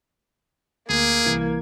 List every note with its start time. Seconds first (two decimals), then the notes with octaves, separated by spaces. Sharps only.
0.89 D2 A#3 G#4
1.26 C2 E3 G#6